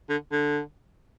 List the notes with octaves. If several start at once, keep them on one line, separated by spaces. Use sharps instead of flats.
D3
D3